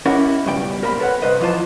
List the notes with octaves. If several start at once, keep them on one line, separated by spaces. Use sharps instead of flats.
C#4 D#4 E4 G4 A#4 F#5
C#2 G2 B2 G3 G5
A#2 A#4 C5 E5 B5
A4 B4 C#5 F#5
G2 C3 B4 C5 D#5
E3 F3 F4 C5 A5